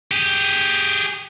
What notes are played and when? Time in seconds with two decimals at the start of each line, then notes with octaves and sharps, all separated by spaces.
0.11 G4 G#4